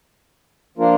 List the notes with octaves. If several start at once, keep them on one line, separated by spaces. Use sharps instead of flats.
F3 A#3 D4 F4 A#4